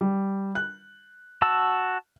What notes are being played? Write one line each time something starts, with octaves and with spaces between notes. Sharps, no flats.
G3
F#6
F#4 A5 E6